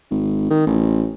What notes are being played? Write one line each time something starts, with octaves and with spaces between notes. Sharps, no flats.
G#1
D#3
A1